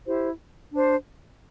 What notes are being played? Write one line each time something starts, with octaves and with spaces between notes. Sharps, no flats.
E4 G4 C5
D4 C5